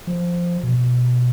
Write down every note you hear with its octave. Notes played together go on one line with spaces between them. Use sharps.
F3
B2